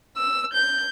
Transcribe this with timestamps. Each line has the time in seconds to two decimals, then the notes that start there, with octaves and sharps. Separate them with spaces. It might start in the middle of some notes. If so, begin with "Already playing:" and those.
0.17 E6
0.54 G6